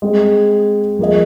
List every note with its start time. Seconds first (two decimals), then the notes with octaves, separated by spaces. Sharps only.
0.02 G#3 C4 G#4
0.99 F3 A#3 G#4 D#5